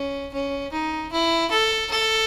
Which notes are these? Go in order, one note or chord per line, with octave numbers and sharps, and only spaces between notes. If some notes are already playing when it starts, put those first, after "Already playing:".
Already playing: C#4
C#4
D#4
E4
A4
A4